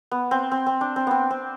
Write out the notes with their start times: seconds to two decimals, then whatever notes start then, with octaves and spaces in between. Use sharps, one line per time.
0.11 B3
0.31 C4
0.51 C4
0.66 C4
0.81 D4
0.96 C4
1.07 B3 C4
1.31 C4